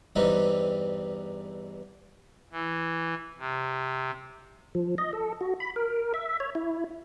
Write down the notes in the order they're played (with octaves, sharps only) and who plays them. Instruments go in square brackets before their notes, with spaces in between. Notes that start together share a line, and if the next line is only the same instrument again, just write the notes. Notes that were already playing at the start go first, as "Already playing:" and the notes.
[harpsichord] E2 G2 E3 G3 C4 D#4
[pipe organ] E3
C3
[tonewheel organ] F3
D#5
A4
F#4
B5
A#4
E5
C#5
E4